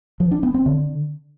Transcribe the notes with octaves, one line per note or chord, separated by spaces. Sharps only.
F3
D4
B3
C4
D3